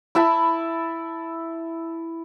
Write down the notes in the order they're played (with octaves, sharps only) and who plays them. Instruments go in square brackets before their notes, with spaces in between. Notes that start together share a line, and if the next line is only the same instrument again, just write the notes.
[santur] E4 E5 A5 B5